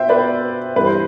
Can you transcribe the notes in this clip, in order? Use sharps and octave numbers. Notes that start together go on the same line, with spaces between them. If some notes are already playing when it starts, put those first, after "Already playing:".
Already playing: B2 C5 E5 G5
B4 D5
G2 E3 G3 B4
C5